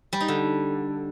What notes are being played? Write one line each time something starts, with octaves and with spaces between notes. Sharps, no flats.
G3
D#4
D3